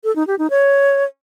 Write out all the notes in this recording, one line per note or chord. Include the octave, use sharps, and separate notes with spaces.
A4
D#4
G4
D#4
C#5